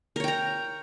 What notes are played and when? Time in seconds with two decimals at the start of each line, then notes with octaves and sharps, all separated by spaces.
0.16 A#4
0.20 C#5
0.24 G5
0.28 A#5